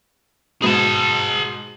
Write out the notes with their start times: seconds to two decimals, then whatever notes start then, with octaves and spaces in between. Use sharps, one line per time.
0.62 G#2 B2 G#4 A5